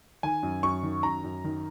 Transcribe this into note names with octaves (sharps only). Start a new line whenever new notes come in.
D#3 G#5
F#2
F#2 C#6
D#3
F#2 A#5
F#2
D#3